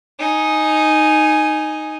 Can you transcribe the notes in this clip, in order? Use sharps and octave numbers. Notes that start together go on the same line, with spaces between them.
D#4 G#5